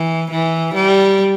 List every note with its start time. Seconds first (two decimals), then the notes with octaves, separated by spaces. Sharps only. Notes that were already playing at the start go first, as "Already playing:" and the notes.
Already playing: E3
0.31 E3
0.75 G3